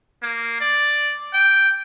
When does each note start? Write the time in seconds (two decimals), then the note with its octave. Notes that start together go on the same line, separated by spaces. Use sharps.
0.22 A#3
0.60 D5
1.33 G5